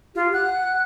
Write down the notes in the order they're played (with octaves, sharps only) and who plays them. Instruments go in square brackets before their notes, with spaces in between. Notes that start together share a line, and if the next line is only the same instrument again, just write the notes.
[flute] F4 [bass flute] G4
[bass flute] F#5 [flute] F#6